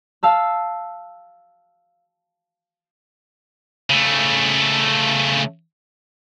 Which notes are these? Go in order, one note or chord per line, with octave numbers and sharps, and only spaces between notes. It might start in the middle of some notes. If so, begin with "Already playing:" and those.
F5 A5 E6
C#3 A3